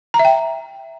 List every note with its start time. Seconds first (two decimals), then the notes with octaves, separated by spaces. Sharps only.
0.14 A#5
0.19 E5
0.25 G5